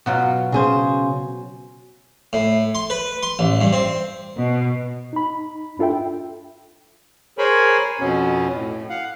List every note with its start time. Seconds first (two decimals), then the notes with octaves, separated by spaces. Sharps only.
0.06 B2 F#3 F4
0.52 C#3 G#4 C5
2.33 A2
2.75 C6
2.90 B4
3.23 C6
3.39 A1
3.61 G2
3.73 C4
4.36 B2
5.13 D#4 B5
5.79 D4 F4 A4 E5 G5
7.38 G#4 A#4 C5 C#5 G#5 B5
8.00 F2 B2 B3 C#4
8.53 A2
8.90 F5 F#5